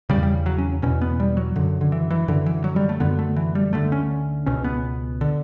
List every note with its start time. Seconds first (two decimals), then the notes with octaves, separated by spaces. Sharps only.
0.10 E2 C#3 G3
0.23 G3
0.46 F#3
0.58 C#4
0.82 E2 B2 C#4
1.01 B3
1.20 G3
1.37 F#3
1.56 F#2 D3
1.81 D3
1.92 E3
2.10 E3
2.28 F#2 D3 E3
2.46 E3
2.64 F#3
2.76 G3
2.89 A3
3.00 F#2 D3 B3
3.19 A3
3.36 E3
3.55 G3
3.73 D2 D3 A3
3.92 C#4
4.46 C#2 B2 C#4
4.64 B3
5.21 D3